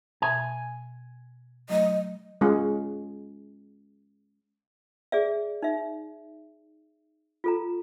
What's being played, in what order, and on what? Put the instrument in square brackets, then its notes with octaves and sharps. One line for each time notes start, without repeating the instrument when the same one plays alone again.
[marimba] B2 E5 D#6 [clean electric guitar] G#5
[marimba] F#3 A3 [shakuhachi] D#5
[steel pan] G#3 C#4 F4 G#4
[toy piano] G#4 D5 E5
D#4 E5
F4 A4 A#5